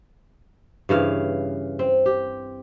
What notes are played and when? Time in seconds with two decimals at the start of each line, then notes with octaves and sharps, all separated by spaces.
0.89 G2 C#3 E3 F5
1.79 C4
2.06 G4